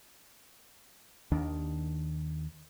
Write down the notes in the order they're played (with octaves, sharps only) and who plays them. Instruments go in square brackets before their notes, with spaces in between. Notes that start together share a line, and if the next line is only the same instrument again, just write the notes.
[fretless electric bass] D#2 D#3 D4